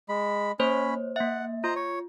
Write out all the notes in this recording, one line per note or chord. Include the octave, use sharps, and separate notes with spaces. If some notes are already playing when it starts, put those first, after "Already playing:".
G#3 B5
A#3 C#4 C5 C#5 B5
A#3 E5 F#5
F4 C5 D#5 A#5
C#5